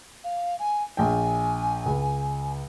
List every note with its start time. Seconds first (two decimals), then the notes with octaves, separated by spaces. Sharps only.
0.23 F5
0.59 G#5
0.97 A#1 G5 G#5
1.86 C#2